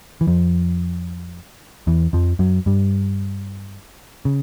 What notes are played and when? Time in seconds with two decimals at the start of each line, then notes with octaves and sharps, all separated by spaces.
0.21 E3
0.27 F2 F3
1.87 E2 E3
2.13 F2 F3
2.39 F#2 F#3
2.66 G2 G3
4.25 C#3